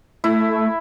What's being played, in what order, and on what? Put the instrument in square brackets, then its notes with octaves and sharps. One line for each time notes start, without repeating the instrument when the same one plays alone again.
[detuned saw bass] A3 [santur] E4